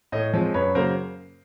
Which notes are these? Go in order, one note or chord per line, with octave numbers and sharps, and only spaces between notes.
A2 C#5 D#5
F3 G#3 C4
F#2 B4 C#5
C#3 F#3 A#3 A#4 C5